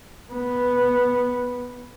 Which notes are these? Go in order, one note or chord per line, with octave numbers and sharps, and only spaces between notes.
B3